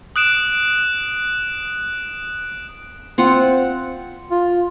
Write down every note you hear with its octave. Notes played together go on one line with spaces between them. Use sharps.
D#6 F#6 D7 E7
C4 F4 F#5
F4